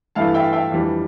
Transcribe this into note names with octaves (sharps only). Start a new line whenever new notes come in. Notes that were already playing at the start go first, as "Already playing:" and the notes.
G2 E3 A3 E4 F5 A5
E5 G5
E5 G5
F2 E3 G3 D4